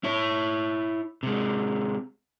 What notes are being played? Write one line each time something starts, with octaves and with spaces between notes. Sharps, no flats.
E4 C#5
C3 G#3